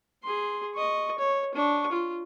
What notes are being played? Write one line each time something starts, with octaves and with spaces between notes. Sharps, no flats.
G#4 C6
D#5 C#6
C#5
D4 C#6
F4